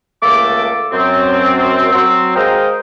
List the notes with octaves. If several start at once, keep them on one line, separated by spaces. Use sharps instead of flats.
C#2 A3 A#3 A4 D6
F#2 C4
F#3 C4
G#3 A#4 C5 D#5 F5 G5